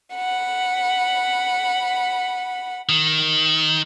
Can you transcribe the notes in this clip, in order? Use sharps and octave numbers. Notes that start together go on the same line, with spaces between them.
F#5 B5
D#3